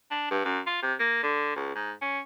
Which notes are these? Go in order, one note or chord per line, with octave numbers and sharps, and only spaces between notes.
D4
G2
F#2
F4
C3
A#3
D3
C#2
G#2
C#4